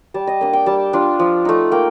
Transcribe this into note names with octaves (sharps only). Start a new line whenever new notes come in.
G3 A5
D#5
A#3 D4 D#5
G5
G3 A5
D4 F4
F3
A3 D#4
A#3 G5